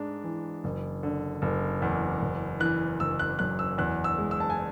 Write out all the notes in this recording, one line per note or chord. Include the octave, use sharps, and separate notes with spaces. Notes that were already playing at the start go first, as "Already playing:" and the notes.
Already playing: G#2 G#3 D4
E3
F#1
D3
F#1
E2
F#1
E3 F#6
F#1 E6
F#6
F#2 F#6
E6
E2 F#6
E6
G#3
E6
A5
G#5